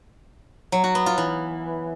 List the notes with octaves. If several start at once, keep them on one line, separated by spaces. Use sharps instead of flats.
F#3
F#4
B3
F4
E3